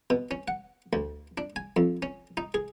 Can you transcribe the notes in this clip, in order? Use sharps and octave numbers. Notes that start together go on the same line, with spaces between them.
B2
C#4
F#5
D2
D4
G#5
F2
C#4
D#4
G#4